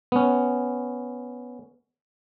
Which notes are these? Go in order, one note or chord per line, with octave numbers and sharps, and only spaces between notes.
B3 C#4